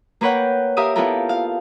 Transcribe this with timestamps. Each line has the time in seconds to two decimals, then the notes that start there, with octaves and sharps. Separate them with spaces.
0.21 A#3 A#4 B4 C#5 F#5 G5
0.77 G4 A#4 E5 F5 D#6
0.96 B3 E4 F4 G4 A4 A#4
1.29 F5